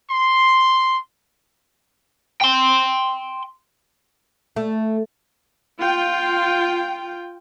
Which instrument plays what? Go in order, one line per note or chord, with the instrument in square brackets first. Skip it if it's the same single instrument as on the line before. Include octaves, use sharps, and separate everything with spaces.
[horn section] C6
[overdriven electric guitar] G5 C6
[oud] A3
[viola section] F4 G5